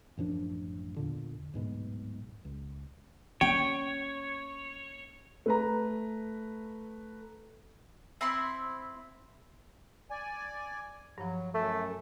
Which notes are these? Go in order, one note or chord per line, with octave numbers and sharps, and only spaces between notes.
A1 F#2 F3 D4
E2 A#2 D3
D1 G#2 B2 G#3
C#2
A#3 C#4 C#5 G5
A3 B4 A#5
C4 E4 B5 C6
D5 G#5
G2 F3 F#3
F#2 A3